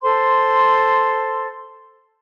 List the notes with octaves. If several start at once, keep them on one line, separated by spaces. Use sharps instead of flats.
A4 C5 C6